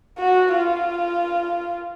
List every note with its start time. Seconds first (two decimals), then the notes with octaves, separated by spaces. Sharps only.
0.19 F#4
0.53 F4